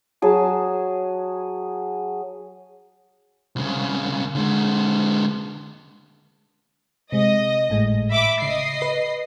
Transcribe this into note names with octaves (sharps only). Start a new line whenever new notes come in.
F#3 G#4 A5
C2 C#3
D3 G#3
C3 G#3 D#5
G#1 A2 G#3
E5 B5 D6
C#3 D#5 C7
B4